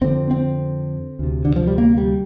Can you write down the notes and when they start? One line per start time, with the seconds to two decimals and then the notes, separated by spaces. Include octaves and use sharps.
0.01 F2 D3 C4
0.31 C4
1.19 D2 C3
1.45 D3
1.56 F3
1.67 G3
1.78 A#3
1.98 G3